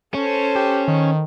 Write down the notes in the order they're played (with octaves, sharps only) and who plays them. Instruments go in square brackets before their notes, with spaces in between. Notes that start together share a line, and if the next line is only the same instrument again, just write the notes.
[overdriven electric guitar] C#4 [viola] A4 C5
[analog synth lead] G4
D#3